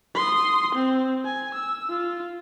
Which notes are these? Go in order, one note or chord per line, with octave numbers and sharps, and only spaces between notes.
C6 D#6
C4
G#5
E6
F4